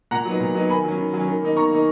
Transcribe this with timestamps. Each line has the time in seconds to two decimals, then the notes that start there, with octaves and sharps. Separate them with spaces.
0.11 A#2 F#5 A#5
0.25 F#3 B3 D#4
0.40 A#2
0.55 F#3 B3 D#4
0.70 D#3 G#5 B5
0.84 F#3 C#4
0.98 D#3
1.13 F#3 C#4
1.27 D#3
1.42 A#3 D#4
1.56 D#3 A#5 C#6
1.71 A#3 D#4